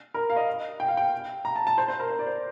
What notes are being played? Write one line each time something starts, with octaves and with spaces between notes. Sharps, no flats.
A#4
F5
D#5
G5
F5
G5
A#5
A5
A5
C5
C5
A#4
C5
D5
C5